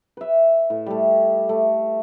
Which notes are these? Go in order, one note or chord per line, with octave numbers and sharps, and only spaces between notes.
B4 E5
A2
G3 A3
A3